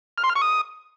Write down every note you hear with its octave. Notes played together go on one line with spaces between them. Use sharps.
F6
C6
F6
C#6
D#6